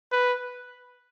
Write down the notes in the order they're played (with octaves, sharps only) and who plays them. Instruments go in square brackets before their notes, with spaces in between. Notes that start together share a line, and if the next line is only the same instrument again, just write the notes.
[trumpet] B4